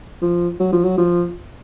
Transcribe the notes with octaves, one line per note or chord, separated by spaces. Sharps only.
F3
F#3
F3
F#3
F3